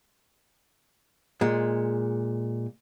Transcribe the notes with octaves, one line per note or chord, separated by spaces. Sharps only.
A#2 G#3